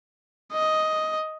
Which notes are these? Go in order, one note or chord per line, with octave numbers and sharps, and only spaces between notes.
D#5